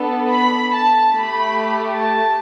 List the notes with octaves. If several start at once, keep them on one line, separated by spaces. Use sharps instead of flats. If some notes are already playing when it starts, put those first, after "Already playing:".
Already playing: B3 D4 A4
B5
A5
A3 G4 B5
A5